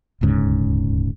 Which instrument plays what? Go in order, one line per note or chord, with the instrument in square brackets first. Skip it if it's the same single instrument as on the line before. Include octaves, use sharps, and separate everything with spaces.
[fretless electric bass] D#1 D2 G#2 C#3